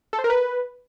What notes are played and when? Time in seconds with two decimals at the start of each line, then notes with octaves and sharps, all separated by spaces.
0.13 A4
0.19 C5
0.24 A#4
0.30 B4